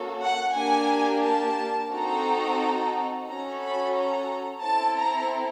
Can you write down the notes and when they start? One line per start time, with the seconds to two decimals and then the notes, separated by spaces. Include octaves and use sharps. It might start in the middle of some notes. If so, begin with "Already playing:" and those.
Already playing: A#3 C#4 F#4 A4
0.22 F#5
0.55 A#3 D4 G4 G#5
1.23 A5
1.92 C4 D#4 F#4 A4 A#5
3.29 C#4 F#4 A4 A#5
3.62 B5
3.96 A#5
4.64 C4 E4 A4 A5
4.98 A#5